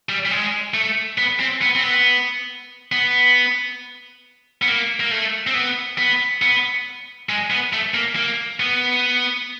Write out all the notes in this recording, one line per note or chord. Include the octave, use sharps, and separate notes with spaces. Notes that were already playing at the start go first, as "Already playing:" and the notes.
G3
G3
G#3
A3
B3
C4
B3
C4
B3
B3
B3
A#3
A#3
A3
C4
B3
B3
B3
G#3
B3
A3
A#3
A#3
B3